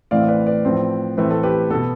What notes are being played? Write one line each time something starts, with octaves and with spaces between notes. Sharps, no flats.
A2 E3 A3 C4 D5 F5
B4 D5
B4 D5
A2 F3 C4
A2 E3 A3 C4 B4
A4
G4 B4
B2 B3 A4